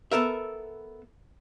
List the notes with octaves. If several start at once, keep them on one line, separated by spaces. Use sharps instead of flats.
B3 A4 A#4 E5